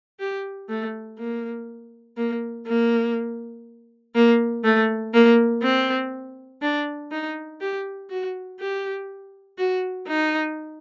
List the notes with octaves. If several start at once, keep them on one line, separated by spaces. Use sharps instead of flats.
G4
A3
A#3
A#3
A#3
A#3
A3
A#3
C4
D4
D#4
G4
F#4
G4
F#4
D#4